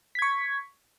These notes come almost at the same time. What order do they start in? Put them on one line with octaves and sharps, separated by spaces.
B6 G#6 C#6